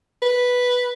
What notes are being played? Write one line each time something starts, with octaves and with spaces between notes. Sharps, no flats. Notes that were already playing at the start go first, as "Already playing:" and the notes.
B4